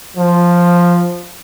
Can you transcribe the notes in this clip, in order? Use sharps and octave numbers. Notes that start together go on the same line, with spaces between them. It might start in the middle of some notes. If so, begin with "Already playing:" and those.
F3